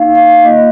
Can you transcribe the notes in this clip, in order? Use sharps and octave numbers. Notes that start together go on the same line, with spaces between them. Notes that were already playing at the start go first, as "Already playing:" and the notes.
Already playing: A#3 D#4 F5
F5
A#3 F4 D#5